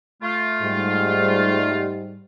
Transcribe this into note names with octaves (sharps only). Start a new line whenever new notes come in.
A3 F4
G#2 G3